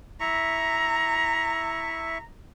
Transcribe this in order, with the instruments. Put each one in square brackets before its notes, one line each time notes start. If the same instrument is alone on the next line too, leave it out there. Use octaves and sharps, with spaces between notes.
[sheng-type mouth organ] E4 E5 C#6 [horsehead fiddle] A#5